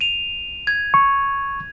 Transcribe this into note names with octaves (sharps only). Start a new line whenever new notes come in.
D#7 F7
G#6
C#6